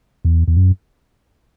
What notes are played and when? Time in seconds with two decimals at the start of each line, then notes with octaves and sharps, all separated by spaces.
0.25 E2
0.48 E2
0.57 F#2